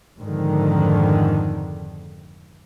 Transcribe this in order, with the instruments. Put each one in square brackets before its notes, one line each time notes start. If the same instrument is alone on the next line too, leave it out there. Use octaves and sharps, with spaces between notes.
[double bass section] F2 G#2 D3 D#3